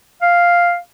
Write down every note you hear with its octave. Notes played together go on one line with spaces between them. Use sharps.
F5